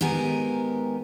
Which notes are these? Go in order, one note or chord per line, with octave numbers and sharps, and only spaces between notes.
G#2 D#3 B3 G4 A#4 G#5